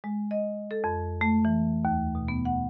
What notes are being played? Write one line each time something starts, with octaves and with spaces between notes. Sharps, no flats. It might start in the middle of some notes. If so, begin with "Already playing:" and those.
G#3
D#5
A4
F2
A3
E3
D#2
B2
B3
F#5